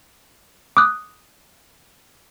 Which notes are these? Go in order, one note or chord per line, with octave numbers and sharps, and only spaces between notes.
D6 D#6 F#6